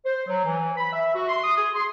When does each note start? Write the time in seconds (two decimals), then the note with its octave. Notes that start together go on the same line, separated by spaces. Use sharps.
0.05 C5
0.27 F#3
0.44 E3
0.77 B5
0.92 E5
1.14 F#4
1.29 C6
1.43 D#6
1.56 G#4
1.74 C6